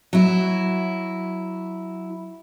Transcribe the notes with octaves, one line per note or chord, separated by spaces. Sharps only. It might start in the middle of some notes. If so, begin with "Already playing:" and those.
F#3 E4